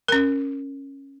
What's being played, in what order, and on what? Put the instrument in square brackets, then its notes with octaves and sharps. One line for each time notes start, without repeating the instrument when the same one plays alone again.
[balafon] C#4 A#4